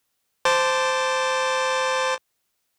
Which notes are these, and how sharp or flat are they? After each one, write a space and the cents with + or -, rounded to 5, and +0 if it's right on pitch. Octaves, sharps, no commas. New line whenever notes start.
C5 -10 A5 +0 D6 +0